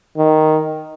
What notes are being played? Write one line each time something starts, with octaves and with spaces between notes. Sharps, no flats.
D#3